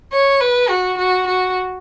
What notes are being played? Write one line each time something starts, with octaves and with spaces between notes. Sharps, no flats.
C#5
B4
F#4
F#4
F#4